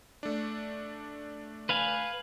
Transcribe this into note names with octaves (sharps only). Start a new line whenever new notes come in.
A3 D4
B4 F5 G#5